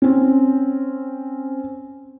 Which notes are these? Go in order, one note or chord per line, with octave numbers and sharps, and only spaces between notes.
C4 C#4